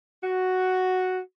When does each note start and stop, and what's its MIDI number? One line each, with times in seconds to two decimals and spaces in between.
0.23 1.19 66